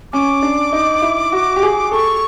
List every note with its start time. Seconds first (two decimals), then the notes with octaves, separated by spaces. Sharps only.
0.13 C#4 D6
0.42 D4
0.72 D#4
1.02 E4
1.32 F#4
1.56 G4
1.63 G#4
1.91 A4 C#6